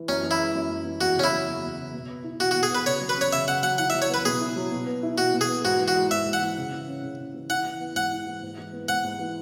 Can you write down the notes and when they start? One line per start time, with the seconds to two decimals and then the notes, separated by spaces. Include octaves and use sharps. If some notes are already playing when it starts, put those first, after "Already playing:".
Already playing: E3
0.09 F#2 C#4
0.23 E3
0.31 E4
0.38 G#3
0.55 F#2
0.69 F#2
0.85 E3
1.01 E2 F#4
1.16 C#3 C#4
1.24 E4
1.32 F#3
1.47 E2
1.63 E2
1.79 C#3
1.94 B2
2.09 B3
2.24 E4
2.39 B2 F#4
2.51 F#4
2.55 B2
2.63 G#4
2.70 B3 B4
2.86 C#3 C#5
3.01 F#3
3.09 B4
3.17 C#4 C#5
3.33 C#3 E5
3.47 C#3 F#5
3.63 F#3 F#5
3.78 E4 F#5
3.90 E5
3.95 F#3
4.02 C#5
4.09 B3 B4
4.25 B2 G#4
4.41 E4
4.56 F#3
4.71 B2
4.86 B3
5.03 E4
5.18 B2 F#4
5.34 B2
5.41 G#4
5.49 B3
5.64 G#2 F#4
5.79 E3
5.88 F#4
5.95 G#3
6.11 G#2 E5
6.25 G#2
6.33 F#5
6.42 E3
6.57 C#3
6.72 E3
6.88 C#4
7.03 C#3
7.19 C#3
7.34 E3
7.50 E4 F#5
7.65 E3
7.80 B3
7.95 G#2 F#5
8.11 E4
8.27 E3
8.43 G#2
8.58 E3
8.73 B3
8.89 G#2 F#5
9.04 G#2
9.19 E3